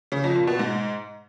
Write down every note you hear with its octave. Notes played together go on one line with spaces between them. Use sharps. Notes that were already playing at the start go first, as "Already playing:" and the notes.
C#3
F2
A#2
B2
G#2